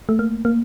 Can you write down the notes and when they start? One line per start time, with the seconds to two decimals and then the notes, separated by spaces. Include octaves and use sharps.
0.09 A3
0.19 A#3
0.45 A#3